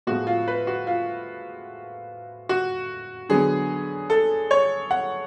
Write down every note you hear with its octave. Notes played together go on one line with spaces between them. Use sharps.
A2 F3 G#3 B3 F#4
F4
B4
F#4
F4
F#4
D3 F#3 B3 G#4
A4
C#5
F#5